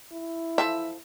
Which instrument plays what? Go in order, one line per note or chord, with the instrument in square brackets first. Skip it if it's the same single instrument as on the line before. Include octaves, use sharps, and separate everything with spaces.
[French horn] E4
[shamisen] E3 F3 A4 [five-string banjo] E5